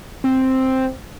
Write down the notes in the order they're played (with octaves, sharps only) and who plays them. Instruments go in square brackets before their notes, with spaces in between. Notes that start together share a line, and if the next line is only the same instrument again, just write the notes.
[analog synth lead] C4